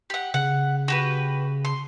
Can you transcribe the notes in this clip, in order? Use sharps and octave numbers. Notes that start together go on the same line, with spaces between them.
G4 F#5
C#3 F#5
F#4 G4 B4
C6